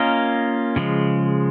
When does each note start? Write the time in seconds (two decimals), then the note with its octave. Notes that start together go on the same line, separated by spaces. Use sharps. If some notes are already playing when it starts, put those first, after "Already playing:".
Already playing: A#3 C#4 F4 A#4 D#5
0.76 C#3 F3 G#3